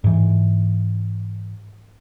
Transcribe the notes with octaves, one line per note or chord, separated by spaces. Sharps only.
G#2 E3